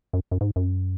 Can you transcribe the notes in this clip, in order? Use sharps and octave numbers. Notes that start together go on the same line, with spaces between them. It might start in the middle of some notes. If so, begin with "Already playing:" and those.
F#2
F#2
G#2
F#2